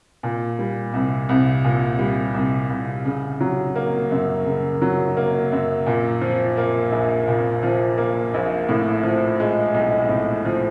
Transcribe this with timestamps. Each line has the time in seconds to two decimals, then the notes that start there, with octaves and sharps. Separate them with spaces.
0.23 A#2
0.59 G3
0.94 C2
1.29 C2
1.64 A#2
1.99 G3
2.35 C2
2.69 C2
3.05 C#3
3.40 F#3
3.76 A#3
4.11 F#2
4.46 C#3
4.82 F#3
5.17 A#3
5.52 F#2
5.86 A#2
6.21 F3
6.57 A#3
6.92 A#1
7.28 A#2
7.63 F3
7.98 A#3
8.34 A#1
8.69 A2
9.03 F3
9.40 G#3
9.75 B1
10.09 A2
10.45 F3